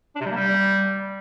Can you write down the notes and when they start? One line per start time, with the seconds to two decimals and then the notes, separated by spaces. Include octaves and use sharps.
0.16 D4
0.21 C3
0.26 G3
0.31 A#3
0.36 G3